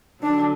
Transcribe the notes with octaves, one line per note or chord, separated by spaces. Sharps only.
D3 F#3 D4